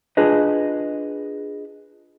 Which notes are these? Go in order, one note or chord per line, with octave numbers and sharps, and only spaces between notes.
D4 F4 G#4 B4 D#5